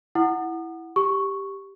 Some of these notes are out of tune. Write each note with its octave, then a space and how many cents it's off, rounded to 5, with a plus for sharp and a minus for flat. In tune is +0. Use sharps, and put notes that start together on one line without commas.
E4 +0 F#5 +0 D#6 -35
G4 +0 C#6 +0